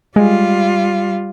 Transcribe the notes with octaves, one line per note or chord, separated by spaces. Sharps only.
G3 G#3 F4